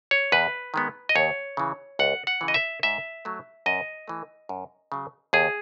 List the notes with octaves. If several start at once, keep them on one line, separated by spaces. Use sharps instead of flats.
C#5
E2 B4
D#3 G#3 B3
D#5
D#2 C#5
C#3 E3
C#2 F#5
F#5
C#3 E3
D#5
E5
G#2 E5
F#3 A3
F#2 D#5
E3 A3
F#2
C#3 F#3
D#2 G#4